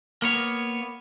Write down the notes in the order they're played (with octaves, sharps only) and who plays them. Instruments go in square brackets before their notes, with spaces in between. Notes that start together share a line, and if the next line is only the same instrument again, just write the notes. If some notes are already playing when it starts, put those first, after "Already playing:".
[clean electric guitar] A#3 B3 C#5